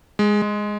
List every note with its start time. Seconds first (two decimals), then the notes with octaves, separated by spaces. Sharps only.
0.19 G#3
0.42 G#3